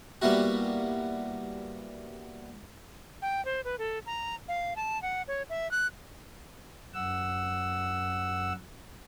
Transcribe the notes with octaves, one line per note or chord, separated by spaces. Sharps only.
G3 A#3 B3 E4 F#4
G5
C5
B4
A4
A#5
F5
A5
F#5
C#5
E5
F#6
F#2 F#5 E6